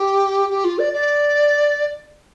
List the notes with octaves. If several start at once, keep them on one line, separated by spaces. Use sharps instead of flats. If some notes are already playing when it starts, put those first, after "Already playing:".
Already playing: G4
G4
F4
D5
D5